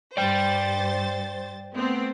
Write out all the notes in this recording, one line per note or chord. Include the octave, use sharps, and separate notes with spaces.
G2 C5 D5 G5 A6
A3 B3 C4